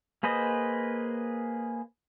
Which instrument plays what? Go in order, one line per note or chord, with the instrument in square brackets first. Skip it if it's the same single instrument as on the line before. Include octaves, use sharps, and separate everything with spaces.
[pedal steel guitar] A#3 G#4 B4 C5 D#5